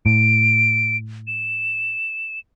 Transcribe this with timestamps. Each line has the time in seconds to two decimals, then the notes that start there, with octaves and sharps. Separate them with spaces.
0.06 A2 D7
1.27 E7